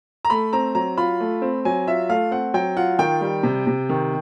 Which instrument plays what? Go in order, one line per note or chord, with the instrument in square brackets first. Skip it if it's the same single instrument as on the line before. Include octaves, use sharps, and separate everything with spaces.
[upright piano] A#5
A3 B5
C4 A#5
F#3 A#5
F4 B5
A3
C4
F#3 G#5
F4 E5
A3 F5
C4 F#5
F#3 G5
F4 F#5
D#3 G5
G3
C3
C3
D#3